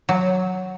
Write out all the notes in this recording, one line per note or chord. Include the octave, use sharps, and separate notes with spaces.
F#3